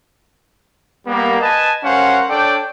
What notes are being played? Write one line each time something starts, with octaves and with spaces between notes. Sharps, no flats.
G3 A#3 B3
B4 D#5 G#5 A5
G3 C#4 A#4 C5 F5 F#5
D4 A4 C#5 D5 G5